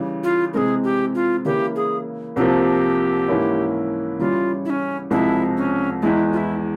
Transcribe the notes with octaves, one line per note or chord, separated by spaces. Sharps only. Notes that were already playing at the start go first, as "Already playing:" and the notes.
Already playing: C#3 E3 G3
F4
C3 E3 G#3 C4 G#4 A#4
G4
F4
C#3 E3 A#3 E4 G4
G#4
C2 C3 F3 A#3 G4
G#2 E3 A#3 C#4 E4
C#3 E3 G3 C#4 E4 F4
E4
C#4
C2 C3 F3 G#3 E4
C#4
E2 E3 G#3 E4
F4
E4